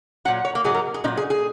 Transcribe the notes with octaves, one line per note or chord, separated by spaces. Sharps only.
A#2 F#3 F#5
C#5
A#3
G#2 F#3 G#4
A#4
G#4
A#2 F#3 D#4
G#4
G#4